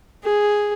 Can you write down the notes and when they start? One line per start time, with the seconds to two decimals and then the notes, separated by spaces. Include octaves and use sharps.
0.24 G#4